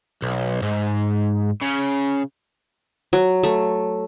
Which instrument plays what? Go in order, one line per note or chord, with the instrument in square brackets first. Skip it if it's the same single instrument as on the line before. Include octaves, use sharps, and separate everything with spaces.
[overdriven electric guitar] B1
G#2
C#3
[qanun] F#3
A3